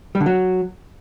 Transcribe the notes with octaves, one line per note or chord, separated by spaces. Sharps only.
G3
D3
F#3